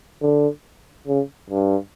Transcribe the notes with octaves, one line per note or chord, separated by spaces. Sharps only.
D3
C#3
G2